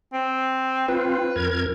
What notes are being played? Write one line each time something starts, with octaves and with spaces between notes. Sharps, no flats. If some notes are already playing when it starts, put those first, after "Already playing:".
C4
C4 F4 B4
F2 A#4 G#6